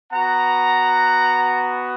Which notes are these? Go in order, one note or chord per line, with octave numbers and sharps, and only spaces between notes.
B3 F#4 F#5 A#5